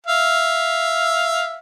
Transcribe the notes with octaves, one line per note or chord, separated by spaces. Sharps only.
E5 F5